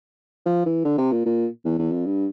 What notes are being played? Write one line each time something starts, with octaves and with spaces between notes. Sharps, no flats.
F3
E3
D3
C3
A#2
A#2
E2
E2
F2
G2